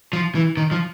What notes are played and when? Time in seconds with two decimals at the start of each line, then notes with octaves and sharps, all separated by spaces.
0.13 F3
0.35 E3
0.57 D#3
0.71 F3